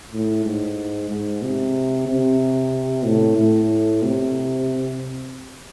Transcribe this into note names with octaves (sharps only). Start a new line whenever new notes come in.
A2
G#2
G#2
C3
C3
A2
A2
C3